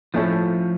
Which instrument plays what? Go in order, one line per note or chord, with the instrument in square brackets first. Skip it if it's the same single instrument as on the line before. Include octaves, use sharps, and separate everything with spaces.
[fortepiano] A2 A3 C#4 A4 [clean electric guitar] F3